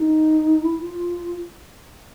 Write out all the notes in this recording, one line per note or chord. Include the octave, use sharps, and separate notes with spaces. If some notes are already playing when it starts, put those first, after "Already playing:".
Already playing: D#4
E4
F4